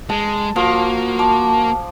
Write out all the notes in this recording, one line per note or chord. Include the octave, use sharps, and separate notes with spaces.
G#3 A5
F3 A#3 F#4
A5 D6